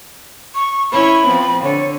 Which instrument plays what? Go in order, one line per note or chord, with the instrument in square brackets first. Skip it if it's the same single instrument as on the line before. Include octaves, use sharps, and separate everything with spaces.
[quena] C#6
[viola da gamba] C#4 E4 C#5 [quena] B5
[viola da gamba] F3 B3 C4
[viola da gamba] D3 [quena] C#5